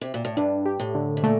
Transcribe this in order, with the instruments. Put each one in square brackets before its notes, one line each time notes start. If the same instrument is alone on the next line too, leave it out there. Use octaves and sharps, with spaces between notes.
[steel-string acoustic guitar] C3
A#2
A2
[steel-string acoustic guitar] G2 [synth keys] D4
[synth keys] G4
[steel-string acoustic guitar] A2
[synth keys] D3
[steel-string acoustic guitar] C3
[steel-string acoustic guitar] A#2 [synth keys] A3